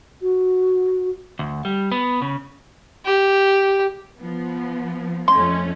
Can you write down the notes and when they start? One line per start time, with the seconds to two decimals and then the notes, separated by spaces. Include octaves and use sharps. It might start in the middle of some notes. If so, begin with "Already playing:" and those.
0.22 F#4
1.39 D2
1.65 G3
1.92 B3
2.22 C#3
3.05 G4
4.18 F3 B3
5.28 F2 A3 C#4 C6